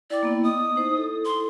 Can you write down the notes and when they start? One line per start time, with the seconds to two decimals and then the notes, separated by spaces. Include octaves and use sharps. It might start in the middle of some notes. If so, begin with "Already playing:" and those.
0.10 E4 D5 G5 D6
0.23 A#3 B3 E4
0.44 D#5 D#6
0.76 D#4 C5
0.96 E4 A4
1.25 C6